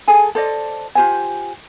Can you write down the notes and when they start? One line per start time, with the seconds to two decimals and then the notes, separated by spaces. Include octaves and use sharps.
0.08 G#4 A4 G#5
0.35 A4 C5 D5 D#5
0.95 F4 G4 C5 G#5